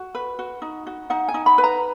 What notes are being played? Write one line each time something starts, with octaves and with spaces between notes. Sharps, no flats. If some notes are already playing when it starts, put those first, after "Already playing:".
Already playing: F#4
B4
F#4
D#4
F#4
D#4 F#5
G#5
D#4
B5
B4
A#5